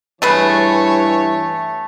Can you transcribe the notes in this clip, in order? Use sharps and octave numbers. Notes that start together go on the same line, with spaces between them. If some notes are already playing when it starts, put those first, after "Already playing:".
G2 E3 A3 G#4 B4 C#5